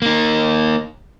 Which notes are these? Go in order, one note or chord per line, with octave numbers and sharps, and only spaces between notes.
A#3 D#4